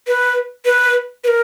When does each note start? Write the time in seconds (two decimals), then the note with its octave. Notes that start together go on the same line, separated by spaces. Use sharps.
0.07 B4
0.65 B4
1.24 B4
1.28 A#4